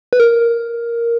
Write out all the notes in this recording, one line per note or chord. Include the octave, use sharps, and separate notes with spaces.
B4
A#4